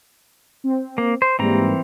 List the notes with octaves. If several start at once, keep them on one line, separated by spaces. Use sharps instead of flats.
C4
A#3
C5
G#2 E3 G3 A#3 C4 A#5